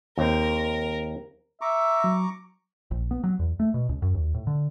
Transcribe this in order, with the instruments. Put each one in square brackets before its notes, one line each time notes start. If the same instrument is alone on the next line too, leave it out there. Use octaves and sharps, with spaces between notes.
[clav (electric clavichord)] D#2 C4 [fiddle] A#4
[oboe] E5 [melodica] A#5 C#6 D6
[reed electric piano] F#3
[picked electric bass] A#1
B3
F#3
E2
A3
B2
C#2
F#2
D#2
A2
D3